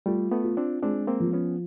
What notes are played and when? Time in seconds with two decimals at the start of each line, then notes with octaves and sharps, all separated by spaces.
0.06 G3 A3 F4
0.31 A3 B3
0.44 F4
0.57 C4 D4
0.82 G#3 C4 D4
1.07 A#3 C4
1.20 F3
1.33 B3 C#4